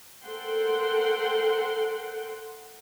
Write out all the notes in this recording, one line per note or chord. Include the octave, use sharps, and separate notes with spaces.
A4 A#4 C5 F#5 G5 C6